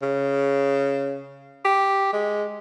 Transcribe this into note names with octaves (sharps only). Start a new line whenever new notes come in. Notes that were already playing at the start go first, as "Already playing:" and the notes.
C#3
G4
G#3